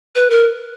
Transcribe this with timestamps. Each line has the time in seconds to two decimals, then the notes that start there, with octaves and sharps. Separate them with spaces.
0.15 B4
0.30 A#4